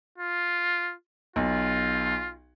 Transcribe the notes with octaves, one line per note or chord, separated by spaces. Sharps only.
F4
B1 F4